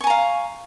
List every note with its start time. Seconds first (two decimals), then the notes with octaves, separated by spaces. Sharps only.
0.01 C#6
0.04 G#5
0.07 A#5
0.10 F5